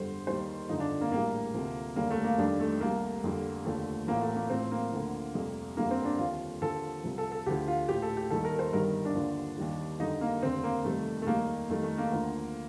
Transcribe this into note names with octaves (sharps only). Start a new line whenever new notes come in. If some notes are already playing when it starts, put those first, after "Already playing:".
Already playing: G1 F2 D3 G3 C5
D#2 D#3 G3 C5
G1 F2 D3 F3 D#4
D4
A#3
A#1 A2 G3 A#3
D2 C3 F3
F1 D#2 D3 G3 A#3
A3
A#3
F2 D#3 G3 D4
A3
C2 C3 G3 A#3
F1 F2 D3 G3
F1 D#2 D3 F3 A3
A1 A2 F3 A#3
A3
A#3
A1 A2 F3 C4
A#3
D2 D3 F3
F1 F2 C3 G3
G1 F2 D3 G3 A#3
C4
D4
D#2 D3 F3 F4
D#2 D3 F3 A4
C2 C3 F3
A4
A4
D2 D3 F3 G4
F4
A#1 A2 F3 G4
A4
G4
D#2 D#3 G3 A4
A#4
C5
G1 G2 D#3 G3 A#4
D4
D#2 D3 F3
D#2 D#3 G3
F2 D3 G3 D#4
A#3
F1 D#2 D3 C4
A#3
F2 C3 D#3 G3 A3
A3
F1 D#2 D#3 G3 A#3
F2 D#3 G3 A3
A3
A#3
D2 D3 F3